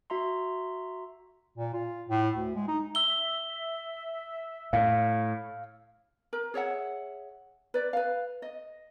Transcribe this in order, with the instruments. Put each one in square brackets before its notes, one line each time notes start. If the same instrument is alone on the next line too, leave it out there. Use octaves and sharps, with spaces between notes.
[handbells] F#4 E5 A#5 C6
[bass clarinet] A#2
F4
A2
D2
G#3
D#4
[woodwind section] E5 [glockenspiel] E6 G7
[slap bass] A2 [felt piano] F5
[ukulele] A#4
G#4 C#5 E5 F#5
B4 D5
B4 F5
D#5